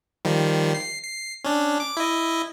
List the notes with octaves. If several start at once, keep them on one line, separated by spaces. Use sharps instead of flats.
D#3 F3 G3
C7
C7
C#4 D4
D6
E4 D#5